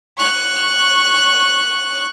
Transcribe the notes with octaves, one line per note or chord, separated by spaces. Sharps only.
C#6 F#6